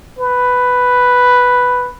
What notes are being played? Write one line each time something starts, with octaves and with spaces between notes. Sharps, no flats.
B4